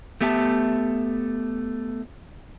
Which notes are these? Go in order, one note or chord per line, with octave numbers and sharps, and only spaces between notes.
A3 B3 G4 E5 G5 A5